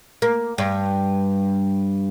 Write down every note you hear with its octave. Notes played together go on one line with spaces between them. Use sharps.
A#3
G2